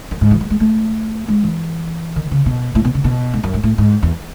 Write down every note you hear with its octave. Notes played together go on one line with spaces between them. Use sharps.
F#2
G#2
E3
F#3
G#3
A3
G#3
E3
D#3
C#3
B2
A2
B2
C#3
B2
G#2
F#2
G#2
A2
G#2
E2